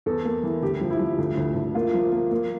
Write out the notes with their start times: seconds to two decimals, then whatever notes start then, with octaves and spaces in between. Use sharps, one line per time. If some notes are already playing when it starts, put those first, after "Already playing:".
0.06 E2 A4
0.25 A#3
0.43 E3
0.63 D2 G4
0.81 F3
0.91 E4
1.00 F3
1.18 D2
1.37 D2
1.55 D2
1.75 A#3 F4
1.94 F3
2.12 A#3
2.31 A#3